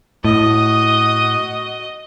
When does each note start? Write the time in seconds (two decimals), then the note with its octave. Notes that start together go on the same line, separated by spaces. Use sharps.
0.24 A2 F#4 D#5 D#6